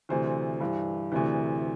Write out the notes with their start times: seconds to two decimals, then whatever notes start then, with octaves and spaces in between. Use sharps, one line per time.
0.09 D2 C3 E3 C5
0.60 G2 E3
1.12 D2 C3 E3